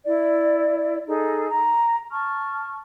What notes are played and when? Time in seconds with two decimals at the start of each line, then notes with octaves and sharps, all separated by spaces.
0.05 E4 D5
1.07 D#4 G#4 A4
1.49 A#5
2.12 A5 C#6 F6